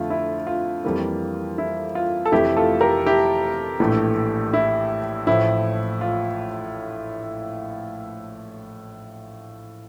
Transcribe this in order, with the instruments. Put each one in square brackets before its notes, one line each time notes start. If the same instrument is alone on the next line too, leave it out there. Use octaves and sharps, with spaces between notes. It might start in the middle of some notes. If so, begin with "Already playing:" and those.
Already playing: [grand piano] F2 D3 A3 F4
E4
F4
F2 E3 G3 A#3
E4
F4
A4
F1 F2 E3 A3 E4 G4
F4 A4
G4 A#4
E4 G4
A#1 A2 E3 A3
E4
A1 A2 F3 E4
F4